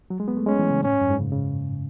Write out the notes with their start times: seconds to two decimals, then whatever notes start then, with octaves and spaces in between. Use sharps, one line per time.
0.10 F#3
0.20 G#3
0.28 B3
0.37 A3
0.46 G#3 C#4
0.59 E3
0.71 C#3
0.83 A2 C#4
0.93 G#2
1.01 F#2
1.10 G#2
1.20 C#3
1.32 C#3